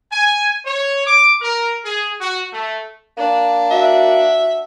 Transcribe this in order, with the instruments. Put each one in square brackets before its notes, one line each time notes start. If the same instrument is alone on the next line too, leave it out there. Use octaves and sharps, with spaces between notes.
[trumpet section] G#5
C#5
D6
A#4
G#4
F#4
A3
[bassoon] A#3 [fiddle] D4
[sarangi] F#4 [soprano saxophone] E5